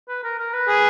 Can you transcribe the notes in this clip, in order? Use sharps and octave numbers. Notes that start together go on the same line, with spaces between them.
B4
A#4
A#4
B4
G#4